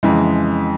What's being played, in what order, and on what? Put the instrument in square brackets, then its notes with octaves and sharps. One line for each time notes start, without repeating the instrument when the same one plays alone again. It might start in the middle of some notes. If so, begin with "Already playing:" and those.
[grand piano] F2 C#3 E3 G#3